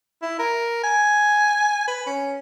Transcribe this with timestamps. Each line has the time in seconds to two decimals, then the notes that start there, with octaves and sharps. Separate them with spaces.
0.22 E4
0.39 A#4
0.84 G#5
1.88 B4
2.07 C#4